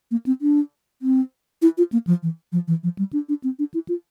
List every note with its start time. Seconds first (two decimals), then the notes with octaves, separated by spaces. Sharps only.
0.11 A#3
0.26 C4
0.42 D4
1.02 C4
1.62 E4
1.78 F4
1.93 A#3
2.07 F3
2.23 E3
2.52 F3
2.68 E3
2.83 F3
2.99 G3
3.13 D4
3.29 D4
3.44 C4
3.59 D4
3.74 E4
3.89 F4